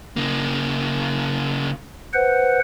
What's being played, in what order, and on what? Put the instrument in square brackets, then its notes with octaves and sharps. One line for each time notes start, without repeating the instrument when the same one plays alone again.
[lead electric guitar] C#3 A#3
[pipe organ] B4 C5 F#5